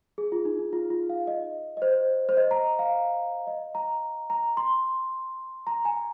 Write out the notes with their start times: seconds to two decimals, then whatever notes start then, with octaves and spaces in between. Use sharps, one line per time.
0.18 G#4
0.32 F4
0.45 D#4
0.59 D#4
0.73 F4
0.90 F4
1.09 F5
1.27 D#5
1.77 D#5
1.82 C5
2.29 C5
2.37 D#5
2.51 A#5
2.79 F5
3.47 D#5
3.75 A#5
4.30 A#5
4.57 C6
5.67 A#5
5.85 G#5